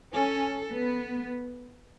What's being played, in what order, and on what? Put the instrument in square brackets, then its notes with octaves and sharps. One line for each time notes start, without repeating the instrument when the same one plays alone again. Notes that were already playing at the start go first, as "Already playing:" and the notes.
[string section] C#4 [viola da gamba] A4
[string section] B3